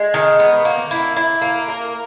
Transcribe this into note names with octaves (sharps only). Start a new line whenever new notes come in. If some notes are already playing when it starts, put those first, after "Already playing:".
Already playing: G#3
D#3
B3
A#3
E4
E4
A#3
A#4